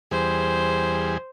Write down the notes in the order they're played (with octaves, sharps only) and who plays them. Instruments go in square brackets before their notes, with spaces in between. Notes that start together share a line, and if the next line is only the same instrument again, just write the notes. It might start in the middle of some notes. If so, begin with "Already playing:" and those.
[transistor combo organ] E2 G3 G#4 [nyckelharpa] C5